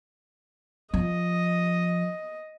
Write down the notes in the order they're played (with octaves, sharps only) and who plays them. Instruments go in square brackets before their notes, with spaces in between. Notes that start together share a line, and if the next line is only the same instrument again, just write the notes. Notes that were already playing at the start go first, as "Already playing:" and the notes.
[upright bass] F3 [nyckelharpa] D#5